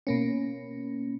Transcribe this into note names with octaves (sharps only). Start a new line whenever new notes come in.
B2 A#3 C#4